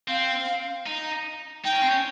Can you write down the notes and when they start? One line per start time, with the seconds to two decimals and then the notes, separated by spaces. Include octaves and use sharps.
0.08 C4 F5
0.86 D#4
1.64 D#4 G5
1.73 C#4
1.82 C4
1.90 C#4